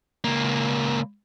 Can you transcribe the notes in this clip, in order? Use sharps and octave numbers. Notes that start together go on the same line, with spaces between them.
C#2 A#3